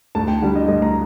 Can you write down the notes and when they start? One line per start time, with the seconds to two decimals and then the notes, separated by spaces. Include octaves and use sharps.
0.15 D2 A5
0.28 G5
0.42 D3 G3
0.55 D#5
0.68 D2 D#5
0.82 A#5